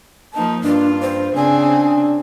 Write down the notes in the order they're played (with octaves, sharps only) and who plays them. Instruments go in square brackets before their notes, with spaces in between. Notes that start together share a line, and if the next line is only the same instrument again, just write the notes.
[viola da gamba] F3 A#3 D#4 [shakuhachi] A5
[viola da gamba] G2 F4 [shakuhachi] D4
[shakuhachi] C5
[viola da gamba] C#3 C4 G#4 [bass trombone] D4 [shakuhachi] G#5